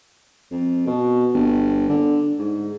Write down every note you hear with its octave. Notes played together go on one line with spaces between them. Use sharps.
F2
B2
G1
D3
G#2